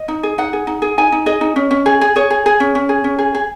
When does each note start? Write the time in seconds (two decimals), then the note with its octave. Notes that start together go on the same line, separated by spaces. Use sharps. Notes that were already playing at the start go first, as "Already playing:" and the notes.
Already playing: D#5
0.08 D#4
0.23 G#4
0.38 D#4 F#5
0.53 G#4
0.67 D#4
0.82 G#4
0.98 D#4 G#5
1.12 D#4
1.26 G#4 D#5
1.41 D#4
1.56 C#4
1.71 C#4
1.86 G#4
2.01 G#4
2.16 G#4 C#5
2.30 G#4
2.46 G#4
2.60 C#4
2.75 C#4
2.89 G#4
3.04 C#4
3.19 G#4
3.35 G#4